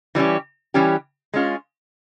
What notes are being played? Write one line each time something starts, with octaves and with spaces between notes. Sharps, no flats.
E3 G3 C#4 G4
E3 G3 C#4 G4
G#3 C#4 F4